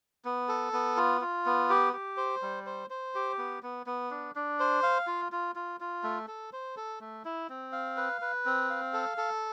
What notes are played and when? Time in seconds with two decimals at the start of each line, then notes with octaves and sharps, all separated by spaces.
0.25 B3
0.49 A4
0.73 B3
0.97 F4
1.21 F4
1.46 B3
1.70 G4
1.93 G4
2.17 C5
2.42 G3
2.66 C5
2.90 C5
3.15 G4
3.38 B3
3.63 B3
3.86 B3
4.11 D4
4.36 D4
4.60 C5
4.83 F5
5.07 F4
5.32 F4
5.55 F4
5.80 F4
6.03 A3
6.28 A4
6.53 C5
6.77 A4
7.00 A3
7.25 E4
7.50 C4
7.72 F5
7.97 B4
8.21 B4
8.46 C4
8.70 F5
8.93 A4
9.17 A4